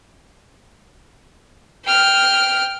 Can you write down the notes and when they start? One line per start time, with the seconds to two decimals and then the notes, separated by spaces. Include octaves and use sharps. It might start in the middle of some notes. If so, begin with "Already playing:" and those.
1.85 G5 F6